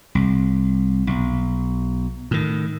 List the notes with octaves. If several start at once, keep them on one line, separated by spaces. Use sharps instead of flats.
C2
B1
A2 D#3